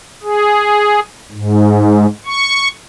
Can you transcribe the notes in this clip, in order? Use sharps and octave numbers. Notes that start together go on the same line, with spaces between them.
G#4
G#2
C#6